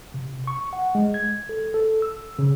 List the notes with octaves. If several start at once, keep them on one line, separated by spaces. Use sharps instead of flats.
C3
C#6
F#5
G#3
G#6
A4
A4
E6
C#3